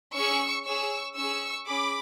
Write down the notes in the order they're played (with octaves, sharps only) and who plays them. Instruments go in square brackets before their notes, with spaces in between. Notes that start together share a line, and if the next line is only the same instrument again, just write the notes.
[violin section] C#4 G#4 C#6 E6
C#4 G#4 C#6 E6
C#4 G#4 C#6 E6
C#4 G#4 B5 D6